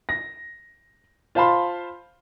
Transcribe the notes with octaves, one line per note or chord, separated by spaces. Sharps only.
A#6
F4 C5 F5 A5 B5 C6